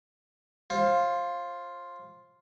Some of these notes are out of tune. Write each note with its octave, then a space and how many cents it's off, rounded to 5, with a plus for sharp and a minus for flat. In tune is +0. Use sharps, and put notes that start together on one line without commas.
F4 +0 C5 +35